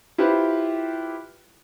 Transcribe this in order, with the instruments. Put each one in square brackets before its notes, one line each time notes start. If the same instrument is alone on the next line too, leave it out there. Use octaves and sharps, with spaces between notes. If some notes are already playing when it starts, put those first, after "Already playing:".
[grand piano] E4 F4 G4 B4 C5